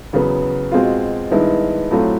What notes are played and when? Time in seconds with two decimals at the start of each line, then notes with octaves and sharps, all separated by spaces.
0.13 E2 C#3 F#3 B3
0.72 B2 G#3 C4 F4
1.31 G2 D#3 G#3 B3 E4
1.91 A2 F#3 A3 C4 F4